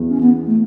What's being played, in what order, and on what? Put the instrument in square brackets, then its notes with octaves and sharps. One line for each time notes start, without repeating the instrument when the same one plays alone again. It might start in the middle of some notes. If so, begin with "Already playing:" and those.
Already playing: [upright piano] E2
[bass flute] C#4
B3
A3